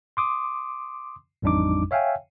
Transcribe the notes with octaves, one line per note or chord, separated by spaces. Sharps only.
C6 D6 D#6
A1 F2 G3 D4 D#4 D6
C#5 E5 F5 G5 G#5